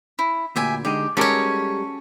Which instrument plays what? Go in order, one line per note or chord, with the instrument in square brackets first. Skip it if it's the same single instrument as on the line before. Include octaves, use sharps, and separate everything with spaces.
[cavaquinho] E4
[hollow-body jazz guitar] D2 A#2 [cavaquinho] G4 E5 G#5
[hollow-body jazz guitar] D3 G#3 D#4 [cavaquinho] G4
[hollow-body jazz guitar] G3 G#3 A#4 [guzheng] C#4 C#5 [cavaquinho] F#4 A4 D6